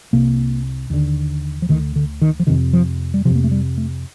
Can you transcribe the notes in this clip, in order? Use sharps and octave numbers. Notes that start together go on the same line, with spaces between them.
C2 C3 A#3
D#2 D3
F3
D2 D3 D#3
D3
D#3
F3
F2 C3 D#3
F3
G3
F2 C3 F3
A#3
A3
G3
A3